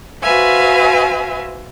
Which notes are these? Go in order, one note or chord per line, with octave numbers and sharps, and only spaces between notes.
F#4 B4 C5 E5 F5 G#5